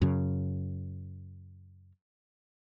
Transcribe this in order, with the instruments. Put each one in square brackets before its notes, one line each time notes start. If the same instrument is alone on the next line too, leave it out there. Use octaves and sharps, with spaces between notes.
[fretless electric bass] F#2 C#3